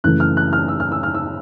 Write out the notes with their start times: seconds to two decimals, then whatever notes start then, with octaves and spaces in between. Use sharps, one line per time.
0.04 F#2 C#3 E3 A3 F#6
0.20 F6
0.37 F#6
0.53 F6
0.68 E6
0.80 F6
0.92 E6
1.03 F6
1.14 E6